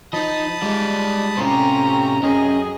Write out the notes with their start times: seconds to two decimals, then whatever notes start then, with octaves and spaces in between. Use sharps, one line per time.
0.13 F3 D#4 D#5 A5 B5 D#6
0.62 G3 G#3 D#4 F4 D5
1.37 A2 C3 C#4 F4 G4 C5 A#5
2.23 F#2 C#4 G#4 D#5